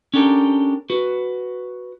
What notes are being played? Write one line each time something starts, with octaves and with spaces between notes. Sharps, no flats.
C#4 D4 G4 A4 A#4
F#4 B4